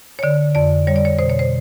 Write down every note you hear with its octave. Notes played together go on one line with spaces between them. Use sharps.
C#5
D3 D5
F2 D5
G3 C#5
D5
C#5
B2 C5
C#5
C5